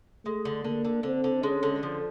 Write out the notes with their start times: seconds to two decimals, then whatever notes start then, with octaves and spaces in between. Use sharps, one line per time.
0.25 G#3 A3
0.45 D3
0.64 D3 A#3
0.85 D3
1.03 D3 C4
1.24 D3
1.43 G#3 C#4
1.63 D3
1.83 F3